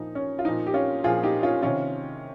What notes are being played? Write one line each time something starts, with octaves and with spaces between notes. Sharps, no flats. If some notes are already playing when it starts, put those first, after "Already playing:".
Already playing: A#2 F3 D#4
C#4
F4
A#2 F3 D#4
G4
C#4 F4
A#2 F3 F4 G#4
D#4 G4
C#4 F4
C3 D#3 C#4 F4